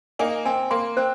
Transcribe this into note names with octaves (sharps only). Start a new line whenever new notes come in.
A#3 D#4 G#5
C4 G#5
A#3 C6
C4 C5